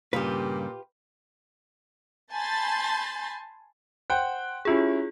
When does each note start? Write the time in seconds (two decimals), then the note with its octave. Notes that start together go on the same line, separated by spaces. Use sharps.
0.13 G2 A#2 C#3 G3 A#3 F4 G4 B4
2.32 G#5 A5 B5 C6 G6 A6
4.10 C5 F#5 G5 F#6
4.65 C#4 E4 F4 G4 G#4